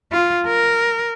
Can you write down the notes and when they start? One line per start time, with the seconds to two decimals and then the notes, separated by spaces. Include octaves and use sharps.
0.12 F4
0.47 A#4